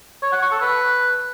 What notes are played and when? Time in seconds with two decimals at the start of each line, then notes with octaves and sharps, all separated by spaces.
0.22 C#5
0.32 F#5
0.42 C#6
0.52 A4
0.62 B4